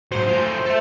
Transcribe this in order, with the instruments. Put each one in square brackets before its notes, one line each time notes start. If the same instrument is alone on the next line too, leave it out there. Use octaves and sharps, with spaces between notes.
[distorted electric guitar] G#2 F#3 [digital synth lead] C5
[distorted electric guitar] A3 F4
A4 E5